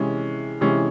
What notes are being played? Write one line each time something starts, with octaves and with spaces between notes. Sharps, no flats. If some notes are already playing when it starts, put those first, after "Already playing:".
Already playing: C3 E3 G#3 C#4
C3 E3 G#3 C#4